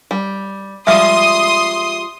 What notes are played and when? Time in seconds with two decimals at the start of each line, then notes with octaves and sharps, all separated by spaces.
0.11 G3
0.87 F3 G3 G#3 E5 C6 D#6